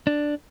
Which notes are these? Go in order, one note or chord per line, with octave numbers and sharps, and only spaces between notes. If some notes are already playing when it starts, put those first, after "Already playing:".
D4